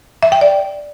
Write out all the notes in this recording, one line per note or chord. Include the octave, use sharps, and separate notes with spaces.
E5
G5
D5